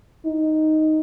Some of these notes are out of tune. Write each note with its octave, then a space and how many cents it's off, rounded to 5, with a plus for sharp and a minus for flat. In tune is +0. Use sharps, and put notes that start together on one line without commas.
D#4 +0